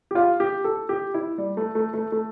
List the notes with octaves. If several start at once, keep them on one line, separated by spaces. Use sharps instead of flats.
G4
F4
G4
A4
G4
E4
G3
A3
A3
A3
A3